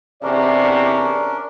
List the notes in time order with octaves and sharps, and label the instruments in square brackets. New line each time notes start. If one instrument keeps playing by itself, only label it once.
[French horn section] E2 C3 [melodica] C#4 D4 A#4 [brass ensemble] D5